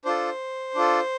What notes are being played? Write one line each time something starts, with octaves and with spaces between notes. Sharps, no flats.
D4 F4 A4 C5
D4 F4 A4